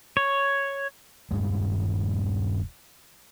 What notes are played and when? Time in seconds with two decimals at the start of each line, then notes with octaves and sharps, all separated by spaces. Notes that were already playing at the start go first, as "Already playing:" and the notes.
0.17 C#5
1.31 D#1 C#2 G2 G#3